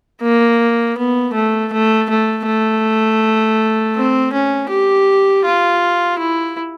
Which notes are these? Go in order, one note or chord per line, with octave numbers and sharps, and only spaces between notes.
A#3
B3
A3
A3
A3
A3
C4
C#4
G4
F4
E4